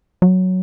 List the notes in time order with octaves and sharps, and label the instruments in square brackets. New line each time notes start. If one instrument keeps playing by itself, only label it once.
[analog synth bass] F#3